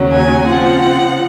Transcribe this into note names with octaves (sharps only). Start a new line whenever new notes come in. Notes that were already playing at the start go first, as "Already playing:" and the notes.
Already playing: D#2 C#3 F#3 C#4
G#5
C#3 F3 C4 F#5